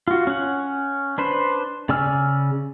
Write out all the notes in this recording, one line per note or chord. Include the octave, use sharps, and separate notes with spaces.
F4 F#4
C#4 F#5
D4 B4 C5
C#3 D5 G#5 E6 F6